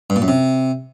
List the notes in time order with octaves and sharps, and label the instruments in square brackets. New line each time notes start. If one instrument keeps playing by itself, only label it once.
[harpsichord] G2
A#2
F#2
C3